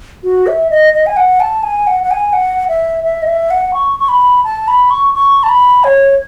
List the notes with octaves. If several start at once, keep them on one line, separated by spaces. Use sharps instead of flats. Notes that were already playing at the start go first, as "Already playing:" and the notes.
F#4
E5
D#5
D#5
G#5
F#5
A5
G#5
F#5
F#5
G#5
F#5
E5
E5
D#5
E5
F#5
C#6
C#6
B5
A5
B5
C#6
C#6
A5
B5
C#5